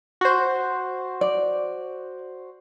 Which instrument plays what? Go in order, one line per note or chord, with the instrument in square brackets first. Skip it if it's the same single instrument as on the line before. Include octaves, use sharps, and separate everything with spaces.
[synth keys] F#4 C5
[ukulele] D5